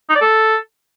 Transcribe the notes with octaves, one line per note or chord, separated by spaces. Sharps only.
D#4
D5
A4